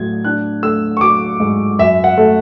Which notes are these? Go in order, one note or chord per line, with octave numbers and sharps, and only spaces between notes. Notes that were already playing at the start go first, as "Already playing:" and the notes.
Already playing: A2 F#3 G#6
D4 F#6
A3 E6
C#6
F#3 D6
G#2
F#2 E5
F#5
A3